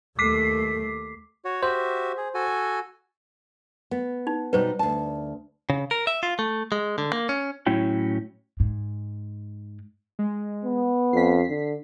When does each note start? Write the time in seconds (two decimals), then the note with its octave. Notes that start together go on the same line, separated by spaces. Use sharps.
0.19 D#2 A3 D6 B6 C7
1.45 F#4 C#5
1.63 F#4 G4 C5 E5
2.17 G#4
2.34 F#4 A4 G#5
3.91 B3
4.27 D#4
4.53 B2 G3 D#4 B4 C5
4.79 D2 A5
5.70 C#3
5.91 A#4
6.07 E5
6.23 F4
6.39 A3
6.72 G#3
6.98 D3
7.13 A#3
7.29 C#4
7.67 A2 F#3 C#4 E4 G5
8.60 G#2
10.19 G#3
10.64 B3
11.13 F2 B6 C7
11.49 D3